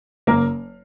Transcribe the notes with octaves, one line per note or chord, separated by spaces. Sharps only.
F#1 A#3 A#4